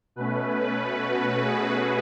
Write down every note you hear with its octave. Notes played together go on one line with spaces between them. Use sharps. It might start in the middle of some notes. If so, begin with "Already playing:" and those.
B2 A3 C#4 B4
B4
F#4
G#4